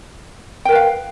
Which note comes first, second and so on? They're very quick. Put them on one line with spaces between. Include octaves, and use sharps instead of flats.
G5 A#4 B4 F5